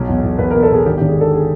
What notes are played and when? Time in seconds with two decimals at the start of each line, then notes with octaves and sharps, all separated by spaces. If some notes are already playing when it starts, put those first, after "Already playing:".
Already playing: B1 F#3
0.08 E2
0.23 E2
0.39 E2 B4
0.51 A#4
0.54 B2
0.63 A4
0.71 B2 G#4
0.86 G#1 G4
0.98 G4
1.01 G#1
1.08 G#4
1.16 D3 A4
1.34 G#4